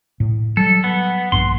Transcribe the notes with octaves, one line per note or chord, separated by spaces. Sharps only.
A2
F#3 G3 A4
B3
A#1 G2 C6